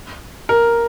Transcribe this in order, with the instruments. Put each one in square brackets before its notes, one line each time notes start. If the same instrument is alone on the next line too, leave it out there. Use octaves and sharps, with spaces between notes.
[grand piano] A#4